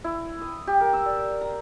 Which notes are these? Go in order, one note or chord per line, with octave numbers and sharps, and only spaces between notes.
E4
D#6
G4
A#4
E6
D5
A#5